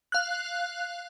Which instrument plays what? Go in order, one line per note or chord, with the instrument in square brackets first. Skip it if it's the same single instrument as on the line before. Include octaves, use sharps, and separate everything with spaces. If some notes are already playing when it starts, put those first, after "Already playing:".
[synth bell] F5 F#6